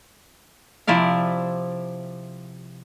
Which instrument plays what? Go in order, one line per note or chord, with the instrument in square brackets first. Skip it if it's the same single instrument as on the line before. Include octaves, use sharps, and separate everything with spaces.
[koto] C3 F3 E4 D5 F5